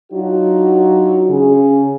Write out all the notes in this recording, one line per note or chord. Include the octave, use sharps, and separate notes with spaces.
F#3 D4 D#4 F4 F#4
C#3 G#4